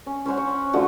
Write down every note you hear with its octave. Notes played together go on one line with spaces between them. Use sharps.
C#4
C#4 C5 C#5 F#5
C#5
D3 F3 A3 F#4